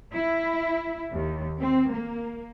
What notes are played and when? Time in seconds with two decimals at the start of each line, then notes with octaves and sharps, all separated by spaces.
0.14 E4
1.13 D#2
1.59 C4
1.92 A#3